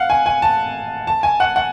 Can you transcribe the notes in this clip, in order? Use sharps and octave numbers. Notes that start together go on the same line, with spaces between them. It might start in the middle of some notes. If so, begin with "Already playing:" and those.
Already playing: F5 F#5
G#5
G#5
A5
A5
G#5
F#5
F#5